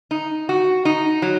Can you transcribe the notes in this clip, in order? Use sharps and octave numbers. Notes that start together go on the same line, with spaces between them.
D#4
F#4
D#4
F#3